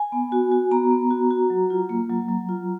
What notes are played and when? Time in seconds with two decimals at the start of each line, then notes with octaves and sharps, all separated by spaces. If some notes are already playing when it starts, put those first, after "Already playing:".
Already playing: G#5
0.12 B3
0.32 F#4
0.51 F#4
0.71 B3 A#5
0.91 B3
1.11 F#4
1.31 F#4
1.50 F#3
1.70 F4
1.89 A#3
2.10 F#3
2.29 F#3
2.49 F4